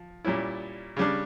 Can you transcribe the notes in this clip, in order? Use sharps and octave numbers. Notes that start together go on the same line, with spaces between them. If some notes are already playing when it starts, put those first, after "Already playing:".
Already playing: F3
A#2 G3 C#4 E4
C#3 G3 D4